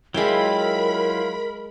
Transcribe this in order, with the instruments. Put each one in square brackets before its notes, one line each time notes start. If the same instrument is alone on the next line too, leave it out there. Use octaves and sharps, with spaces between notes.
[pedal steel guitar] F#3 E4 F4 [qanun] G#3 E5 G5 [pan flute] A#4 [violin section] B5